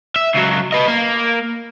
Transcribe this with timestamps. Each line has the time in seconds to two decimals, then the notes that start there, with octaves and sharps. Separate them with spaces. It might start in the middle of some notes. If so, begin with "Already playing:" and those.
0.16 E5
0.35 C#2 F#3
0.73 B4 D#5
0.88 A#3